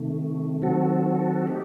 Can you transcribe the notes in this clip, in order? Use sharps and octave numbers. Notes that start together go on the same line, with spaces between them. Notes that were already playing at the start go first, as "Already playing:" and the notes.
Already playing: C3 D#3 A3
D#3 F#3 C4 F#4 A4
A3 D#4 G4